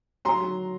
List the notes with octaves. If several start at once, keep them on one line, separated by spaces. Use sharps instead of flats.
F#3 A#5 C6
F#3